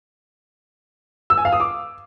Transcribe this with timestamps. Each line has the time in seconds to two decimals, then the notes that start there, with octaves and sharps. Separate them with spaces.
1.30 E6
1.38 G#5
1.45 F5
1.52 D#6
1.60 D6